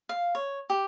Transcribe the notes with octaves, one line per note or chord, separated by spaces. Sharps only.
F5
C#5
G4